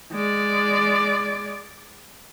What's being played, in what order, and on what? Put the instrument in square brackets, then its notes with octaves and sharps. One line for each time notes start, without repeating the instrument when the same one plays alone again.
[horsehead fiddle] G#3 D5